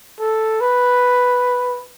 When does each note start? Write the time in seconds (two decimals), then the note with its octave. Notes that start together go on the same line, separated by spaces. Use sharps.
0.20 A4
0.61 B4